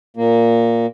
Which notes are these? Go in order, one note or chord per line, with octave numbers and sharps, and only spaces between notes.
A#2 A#3